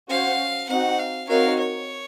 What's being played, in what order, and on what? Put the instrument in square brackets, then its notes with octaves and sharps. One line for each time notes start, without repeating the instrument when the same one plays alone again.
[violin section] C#4 F#4 C5 F#5 [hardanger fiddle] F5
[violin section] C4 D#4 F#4 [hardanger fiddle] F#5
[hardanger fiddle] F5
[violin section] C4 D#4 F#4 A#4 C#5 [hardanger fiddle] F5
[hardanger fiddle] C#5